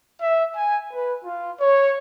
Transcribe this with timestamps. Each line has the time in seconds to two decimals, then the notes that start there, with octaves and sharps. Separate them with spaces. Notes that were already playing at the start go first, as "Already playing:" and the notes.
0.21 E5
0.56 G#5
0.93 B4
1.25 F4
1.61 C#5